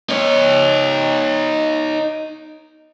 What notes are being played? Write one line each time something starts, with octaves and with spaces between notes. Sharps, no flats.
D#4 C#5